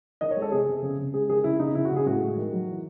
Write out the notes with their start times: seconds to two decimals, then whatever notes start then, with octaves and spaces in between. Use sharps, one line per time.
0.21 D#3 D#5
0.31 C#5
0.36 G#3
0.42 A4
0.52 C3 G#4
0.67 C3
0.82 C#3
0.98 C#3
1.14 G#3 G#4
1.29 D#3 G#4
1.44 C#3 E4
1.59 C#3 D#4
1.75 C#3 E4
1.85 F#4
1.91 C#3
1.96 G#4
2.06 A2 F#4
2.21 G#3
2.37 D#3
2.53 F#3
2.68 E3